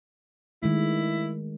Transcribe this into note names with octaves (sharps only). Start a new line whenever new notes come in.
D#3 G#3 A3 E4